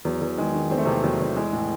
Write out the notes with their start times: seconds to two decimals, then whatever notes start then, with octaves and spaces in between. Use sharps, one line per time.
0.05 E2 F#3
0.21 E2
0.38 D#3 G#3
0.54 D#3
0.71 E2 C4
0.78 A3
0.85 E2 C3 C4
1.04 E2 F#3
1.20 E2
1.36 E3 G#3
1.53 A2